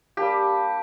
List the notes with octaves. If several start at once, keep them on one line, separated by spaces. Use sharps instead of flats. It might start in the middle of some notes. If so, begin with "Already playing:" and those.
G3 A#3 D4 G4